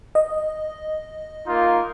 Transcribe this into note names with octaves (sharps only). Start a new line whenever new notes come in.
D#5
A#3 D#4 F4